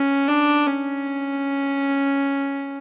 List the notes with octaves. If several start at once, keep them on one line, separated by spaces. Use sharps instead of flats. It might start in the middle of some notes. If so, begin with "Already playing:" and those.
Already playing: C#4
D4
C#4